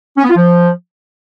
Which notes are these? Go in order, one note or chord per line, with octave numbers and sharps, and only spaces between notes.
C#4
B3
F4
F3